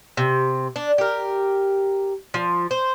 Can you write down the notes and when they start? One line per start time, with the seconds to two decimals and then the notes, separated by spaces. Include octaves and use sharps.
0.17 C3
0.76 D4
0.98 G4 A#4
2.34 F3
2.71 C5